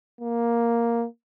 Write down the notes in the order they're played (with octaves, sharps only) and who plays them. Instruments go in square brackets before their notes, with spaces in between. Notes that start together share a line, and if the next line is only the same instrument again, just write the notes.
[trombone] A#3